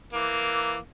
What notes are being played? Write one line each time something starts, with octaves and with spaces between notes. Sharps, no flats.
E3 A#3